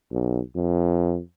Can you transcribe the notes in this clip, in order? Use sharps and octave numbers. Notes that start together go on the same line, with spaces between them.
B1
F2